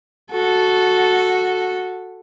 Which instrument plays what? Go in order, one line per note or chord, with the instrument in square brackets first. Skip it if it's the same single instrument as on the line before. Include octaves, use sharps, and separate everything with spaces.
[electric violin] F#4 A4